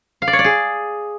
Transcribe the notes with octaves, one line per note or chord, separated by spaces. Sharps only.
F5
D5
C#5
D5
G#4